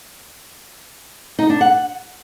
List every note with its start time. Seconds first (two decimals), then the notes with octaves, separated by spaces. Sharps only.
1.39 D#4
1.50 D4
1.61 F#5